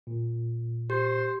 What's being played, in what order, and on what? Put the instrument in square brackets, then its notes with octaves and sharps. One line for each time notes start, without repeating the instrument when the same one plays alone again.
[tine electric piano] A#2
[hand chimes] G4 [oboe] C5